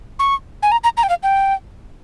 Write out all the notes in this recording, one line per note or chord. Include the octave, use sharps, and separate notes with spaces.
C#6
G#5
A#5
A#5
A#5
G5
F5
G5